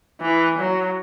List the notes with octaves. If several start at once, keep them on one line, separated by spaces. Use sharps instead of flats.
E3
F#3